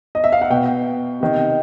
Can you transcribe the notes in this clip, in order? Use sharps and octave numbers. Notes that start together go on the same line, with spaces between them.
D#5
E5
F5
F#5
B2 G5
C3 D#3